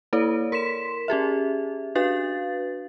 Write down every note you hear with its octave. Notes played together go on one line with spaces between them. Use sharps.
A#3 E4 A4 C#5 D5
A#4 C6 B6 E7
C#4 G4 G#4 E5
D4 F#4 B4 F5 A6